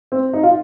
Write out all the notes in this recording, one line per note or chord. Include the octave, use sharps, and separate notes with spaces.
C4
D#4
F4